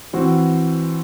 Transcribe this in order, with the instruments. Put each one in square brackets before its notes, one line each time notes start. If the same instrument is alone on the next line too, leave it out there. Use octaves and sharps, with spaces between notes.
[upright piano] E3 C4 F#4